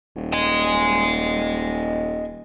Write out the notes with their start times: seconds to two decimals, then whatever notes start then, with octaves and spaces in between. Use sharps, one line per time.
0.16 D#1
0.33 D#5 G#5